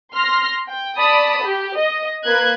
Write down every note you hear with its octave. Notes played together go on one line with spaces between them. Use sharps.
C6 F6 A#6
G5
D5 A5 B5 D#6
G4
D#5
A#3 B4 F#6 G#6